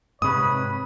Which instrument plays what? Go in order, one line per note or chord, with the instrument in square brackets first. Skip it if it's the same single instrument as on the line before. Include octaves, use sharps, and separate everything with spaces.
[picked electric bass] G#2 C3 [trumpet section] B4 C#5 B5 [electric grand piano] D#6